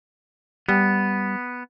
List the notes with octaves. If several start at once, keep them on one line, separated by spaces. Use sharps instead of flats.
G3 B3